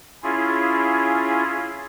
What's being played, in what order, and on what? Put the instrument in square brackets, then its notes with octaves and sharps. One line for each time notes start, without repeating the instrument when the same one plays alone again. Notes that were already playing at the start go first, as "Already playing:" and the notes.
[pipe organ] C#4 E4 F4 G#4